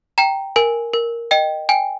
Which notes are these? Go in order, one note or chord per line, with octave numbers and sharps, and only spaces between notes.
G5 A#5
A#4 G#5
A#4
D#5 G5
G5 G#5